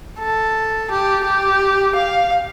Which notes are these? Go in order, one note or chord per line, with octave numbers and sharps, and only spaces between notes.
A4
G4
G4
F5